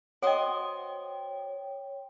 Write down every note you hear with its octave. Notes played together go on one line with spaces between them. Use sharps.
F#4 C5 C#5 D#5 G5